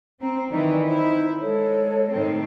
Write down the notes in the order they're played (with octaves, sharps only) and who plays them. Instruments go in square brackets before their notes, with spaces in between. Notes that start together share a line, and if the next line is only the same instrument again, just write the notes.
[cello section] C4 [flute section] A#5
[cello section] D#3 E3 [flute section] D5
[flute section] D#4 C5 [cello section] E4
[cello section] G#3 [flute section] A4 C#5
[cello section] A2 D#3 C4